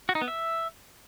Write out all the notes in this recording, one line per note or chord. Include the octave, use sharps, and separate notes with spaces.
F#4
D#4
B3
E5